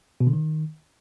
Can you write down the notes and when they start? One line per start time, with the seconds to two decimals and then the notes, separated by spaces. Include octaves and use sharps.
0.20 B2
0.27 D3
0.33 D#3